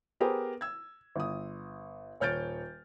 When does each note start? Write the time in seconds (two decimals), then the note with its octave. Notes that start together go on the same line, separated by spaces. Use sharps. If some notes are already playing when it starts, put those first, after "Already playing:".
0.20 B3 G4 G#4 A#4 C5
0.61 E6 G#6
1.16 G1 D#6
2.20 D#1 C#5 F6 G6 A6 D7